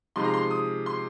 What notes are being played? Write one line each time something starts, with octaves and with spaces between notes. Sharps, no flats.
C3 F3 G#3 D#4 C6
A#5
C6
D#6
C6